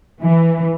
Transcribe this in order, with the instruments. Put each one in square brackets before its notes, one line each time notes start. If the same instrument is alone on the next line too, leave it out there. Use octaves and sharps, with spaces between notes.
[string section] E3